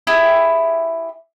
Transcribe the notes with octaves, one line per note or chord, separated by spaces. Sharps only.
E4 G4 G#4